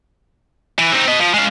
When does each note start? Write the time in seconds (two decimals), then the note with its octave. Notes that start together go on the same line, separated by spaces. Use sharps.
0.79 E3
0.93 C4 D#4
1.07 B3 D#5
1.20 F3
1.34 G#3 F5